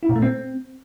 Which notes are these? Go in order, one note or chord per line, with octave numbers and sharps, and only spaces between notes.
E4
A#2
A3
C4